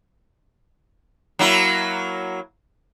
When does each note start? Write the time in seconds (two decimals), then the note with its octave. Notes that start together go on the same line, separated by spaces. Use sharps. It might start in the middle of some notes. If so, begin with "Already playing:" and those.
1.39 F#3 A#3 E4